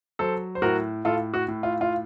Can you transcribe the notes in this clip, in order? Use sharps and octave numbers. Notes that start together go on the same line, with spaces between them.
F#3 A4 C5
C5
A2 F#4 A#4
A2 F4 A4
F#4
A2
F4
F4